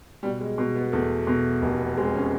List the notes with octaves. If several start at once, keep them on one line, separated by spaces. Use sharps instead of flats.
B2 G3
G#3
B2
B3
E2 A3
B2
F1 A#3
B3
G#3 C4
C#4